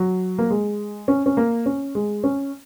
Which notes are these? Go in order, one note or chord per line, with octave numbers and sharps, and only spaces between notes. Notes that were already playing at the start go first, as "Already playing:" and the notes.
Already playing: F#3
A#3
G#3
C#4
C#4
A#3
C#4
G#3
C#4